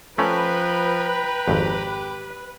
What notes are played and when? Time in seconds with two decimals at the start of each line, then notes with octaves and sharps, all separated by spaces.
0.18 F3 A3 C#4 B4 G5 A#5 B5
1.48 G#1 F2 G4